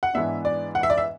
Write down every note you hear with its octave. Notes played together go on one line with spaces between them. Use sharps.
F#5
G#2 E3 B3 D4 E5
D5
F#5
E5
D5
E5